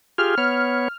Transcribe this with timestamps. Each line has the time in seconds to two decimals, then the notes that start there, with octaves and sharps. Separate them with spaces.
0.18 F4 G4 G#4 F6
0.38 B3 C#5 F6